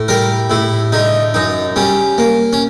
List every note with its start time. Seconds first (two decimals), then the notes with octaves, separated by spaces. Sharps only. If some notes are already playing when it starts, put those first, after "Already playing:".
Already playing: A2
0.08 G3 A#4
0.50 A2 E4
0.92 D3 D#4
1.34 F#2 D#4
1.76 G3 C#4
2.18 A#3
2.53 C#4